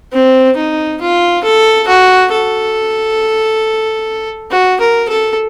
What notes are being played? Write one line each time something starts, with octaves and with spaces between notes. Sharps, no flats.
C4
D#4
F4
A4
F#4
A4
F#4
A#4
A4